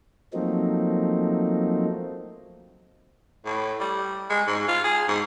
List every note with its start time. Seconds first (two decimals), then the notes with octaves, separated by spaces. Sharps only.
0.33 F3 F#3 A3 A#3 C4 D#4
3.45 A2
3.80 G3
4.30 G#3
4.47 G#2
4.68 F4
4.84 G#4
5.08 G#2